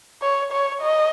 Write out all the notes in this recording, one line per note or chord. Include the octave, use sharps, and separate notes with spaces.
C#5
C#5
D#5